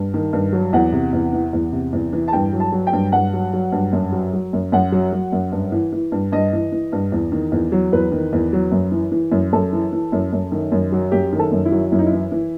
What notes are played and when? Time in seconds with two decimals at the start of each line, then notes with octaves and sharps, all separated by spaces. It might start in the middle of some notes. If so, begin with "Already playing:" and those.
Already playing: G2
0.14 D#3
0.33 G2
0.53 F#3
0.73 E2 F#5
0.92 C3
1.13 E2
1.33 E3
1.53 E2
1.72 C3
1.93 E2
2.13 E3
2.28 A5
2.33 G2 G5
2.53 F#3
2.60 A5
2.72 F#3
2.87 G5
2.93 G2
3.12 G2 F#5
3.33 F#3
3.53 F#3
3.72 G2
3.93 F#2
4.12 F#3
4.33 F#3
4.53 F#2
4.72 F#2 F#5
4.92 F#3
5.12 F#3
5.32 F#2
5.52 G2
5.72 E3
5.92 E3
6.12 G2
6.32 G2 D#5
6.53 E3
6.72 E3
6.92 G2
7.12 E2
7.32 D#3
7.52 E2
7.72 F#3
7.93 E2 B4
8.12 D#3
8.33 E2
8.53 F#3
8.72 F#2
8.92 E3
9.12 E3
9.32 F#2
9.53 F#2 A4
9.73 E3
9.92 E3
10.12 F#2
10.33 F#2
10.52 D#3
10.72 F#2
10.92 F#3
11.12 F#2 G4
11.32 D#3
11.39 A4
11.52 F#2
11.65 E4
11.72 F#3
11.92 F#2 E4
11.99 D#4
12.06 E4
12.12 E3
12.32 E3